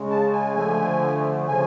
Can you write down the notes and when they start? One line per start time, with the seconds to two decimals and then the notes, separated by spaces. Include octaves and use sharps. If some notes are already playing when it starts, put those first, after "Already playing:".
Already playing: C#3 G#3
0.10 A5
0.33 G#5
0.56 D3 F3 A3
1.47 C#3 F3 G#5